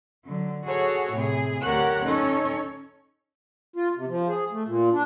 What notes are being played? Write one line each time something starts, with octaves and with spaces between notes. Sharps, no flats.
D3 F#3
F#4 G#4 A4 C#5
A2 C3 G#4
D2 G4 A#4 C#5 F#5 F#6
C#4 D#4 A4 C#5
F4
C3
F3
G#4
A3
A#2
D4